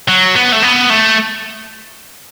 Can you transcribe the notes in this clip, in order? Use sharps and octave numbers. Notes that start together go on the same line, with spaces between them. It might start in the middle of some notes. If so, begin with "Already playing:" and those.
F#3
B3
A3
B3
A3